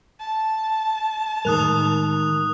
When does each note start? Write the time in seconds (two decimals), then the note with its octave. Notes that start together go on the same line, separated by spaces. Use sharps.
0.20 A5
1.45 A2 D#3 G#3 A#4 D#6 F#6 F7